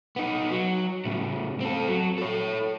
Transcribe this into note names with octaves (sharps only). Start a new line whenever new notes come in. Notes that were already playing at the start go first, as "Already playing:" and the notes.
B3 D#4
F#3
A2 C#3
C4 A4
F#3
A4 C#5